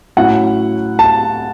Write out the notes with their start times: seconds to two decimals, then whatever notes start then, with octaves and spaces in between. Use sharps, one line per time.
0.17 A2 F#3 C#4 E4 F#5
0.99 A5